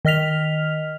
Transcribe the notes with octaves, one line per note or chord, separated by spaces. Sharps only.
D#3 D#5 F6 B6 F7